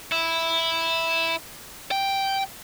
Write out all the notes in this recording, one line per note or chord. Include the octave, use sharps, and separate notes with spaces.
E4
G5